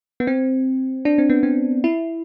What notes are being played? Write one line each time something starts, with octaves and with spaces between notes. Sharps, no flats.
B3
C4
D4
C4
B3
C4
E4